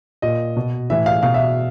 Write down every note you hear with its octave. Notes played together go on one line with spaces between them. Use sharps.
A#2 D#5
B2
A2 E3 E5
F5
B2 F5
E5